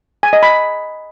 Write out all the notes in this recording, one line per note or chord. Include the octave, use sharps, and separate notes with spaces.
G#5
D#5
B5